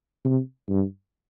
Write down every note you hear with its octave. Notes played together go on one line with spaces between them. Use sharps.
C3
G2